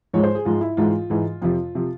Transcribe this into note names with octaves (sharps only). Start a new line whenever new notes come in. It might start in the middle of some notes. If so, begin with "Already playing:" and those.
G#2 F3 G#3 C#5
C5
G#4
G#2 F3 G#3 F4
E4
G#2 E3 G#3 F4
G#2 E3 G#3
F2 C3 F3 F4
C3 F3